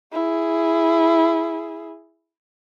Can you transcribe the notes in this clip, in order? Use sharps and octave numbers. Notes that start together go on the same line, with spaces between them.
E4 G#4